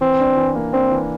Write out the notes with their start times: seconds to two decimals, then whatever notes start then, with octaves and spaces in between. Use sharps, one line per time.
0.01 E3 C4
0.20 D4
0.37 E3
0.55 A#3
0.73 C4 D4
0.91 E3